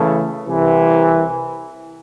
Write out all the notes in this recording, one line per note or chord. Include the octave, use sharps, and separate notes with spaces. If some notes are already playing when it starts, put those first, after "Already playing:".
Already playing: C#3 E3 A3
C2 C3 E3